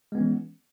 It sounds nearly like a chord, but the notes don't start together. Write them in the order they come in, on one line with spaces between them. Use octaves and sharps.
G#3 B3 C#4 E3